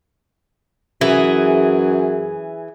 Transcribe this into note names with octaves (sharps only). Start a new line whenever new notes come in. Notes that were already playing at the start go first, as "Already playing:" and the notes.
F#2 E3 G#4